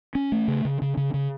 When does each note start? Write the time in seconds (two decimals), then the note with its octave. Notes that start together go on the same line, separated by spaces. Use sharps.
0.15 C#4
0.32 A3
0.48 C#3
0.65 C#3
0.82 C#3
0.97 C#3
1.14 C#3